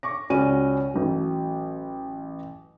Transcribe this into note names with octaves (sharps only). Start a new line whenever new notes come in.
C#6 D6 A#6
C#2 C#4 F#4 D5 D#7
A1 F#3